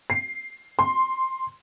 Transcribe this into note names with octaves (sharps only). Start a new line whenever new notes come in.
C7
C6